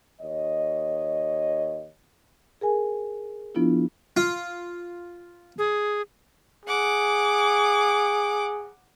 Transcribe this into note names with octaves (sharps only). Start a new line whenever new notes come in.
D#2 C#5 D#5
G#4 A#4 G#5
F3 B3 D4 E4 F4
F4
G#4
G#4 F#5 D6